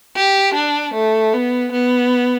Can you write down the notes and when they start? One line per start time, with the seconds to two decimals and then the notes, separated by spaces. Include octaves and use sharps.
0.16 G4
0.55 D4
0.94 A3
1.33 B3
1.72 B3